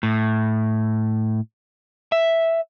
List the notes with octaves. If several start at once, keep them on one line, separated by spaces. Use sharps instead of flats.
A2
E5